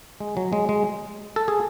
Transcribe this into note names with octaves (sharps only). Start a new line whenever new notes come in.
G#3
F#3
G#3
G#3
A4
G#4